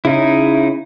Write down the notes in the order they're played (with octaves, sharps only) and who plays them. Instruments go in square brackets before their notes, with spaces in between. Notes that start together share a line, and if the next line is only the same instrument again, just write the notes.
[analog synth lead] C#3 [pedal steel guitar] D#4 E4